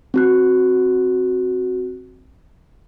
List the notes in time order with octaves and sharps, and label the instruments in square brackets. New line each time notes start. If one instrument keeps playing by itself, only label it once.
[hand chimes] C4 F#4 F#6